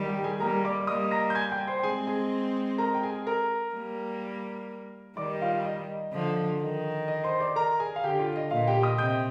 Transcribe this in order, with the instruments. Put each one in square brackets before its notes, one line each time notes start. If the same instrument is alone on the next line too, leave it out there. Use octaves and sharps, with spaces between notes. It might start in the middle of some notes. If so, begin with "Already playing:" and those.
Already playing: [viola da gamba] D#3 G3
[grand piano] G4 G5
G#4 G#5
[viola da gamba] G3 A#3 [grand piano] A#4 A#5
[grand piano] D5 D6
D6
[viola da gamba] G3 A#3 [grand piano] D#5 D#6
[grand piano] A#5 A#6
G6
G#5 G#6
G5 G6
C5 C6
G5
[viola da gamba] G#3 C4 [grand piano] G#4 G#5
[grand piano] G#4 G#5
A#4 A#5
G5
G#4 G#5
A#4 A#5
[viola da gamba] G3 A#3
[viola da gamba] D#3 G3 [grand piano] D5 D6
[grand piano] F4 F5
D#5
D#5
[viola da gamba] D3 F3
D#3
[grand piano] D#5
C5 C6
D5 D6
A#4 A#5
G#4 G#5
F5
[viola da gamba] D3 [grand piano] G4 G5
[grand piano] F4 F5
D#5
[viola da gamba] A#2 [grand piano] F4 F5
[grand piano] G4 G5
D#5 D#6
[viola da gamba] C3 [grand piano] G5 G6